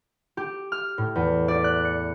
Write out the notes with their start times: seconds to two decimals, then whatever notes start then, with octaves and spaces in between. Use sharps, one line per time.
0.37 G4
0.72 F6
0.98 A2
1.15 E2
1.48 D5
1.64 F#6
1.85 C#7